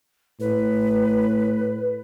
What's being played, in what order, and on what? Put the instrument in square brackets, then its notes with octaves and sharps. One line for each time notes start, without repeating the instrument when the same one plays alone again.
[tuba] A2 [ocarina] B4